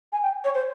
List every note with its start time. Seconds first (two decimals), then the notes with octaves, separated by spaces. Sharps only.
0.12 G#5
0.22 G5
0.44 C#5
0.54 C5